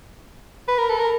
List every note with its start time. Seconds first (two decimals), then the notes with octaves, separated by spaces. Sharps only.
0.68 B4
0.79 A#4
0.89 A4
0.99 A#4